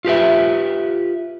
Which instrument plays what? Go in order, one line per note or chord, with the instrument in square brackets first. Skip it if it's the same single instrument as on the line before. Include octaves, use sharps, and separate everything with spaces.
[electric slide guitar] F4 G4 B4 E5